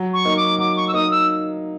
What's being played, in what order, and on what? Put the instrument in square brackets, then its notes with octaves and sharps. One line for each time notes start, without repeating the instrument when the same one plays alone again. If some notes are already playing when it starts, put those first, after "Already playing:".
Already playing: [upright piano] F#3
[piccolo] C#6
[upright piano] A#3 D#4
[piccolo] D6
[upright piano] F#3 [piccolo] D6
[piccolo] C#6
E6
[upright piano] A#3 D#4 [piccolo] D#6
[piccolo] E6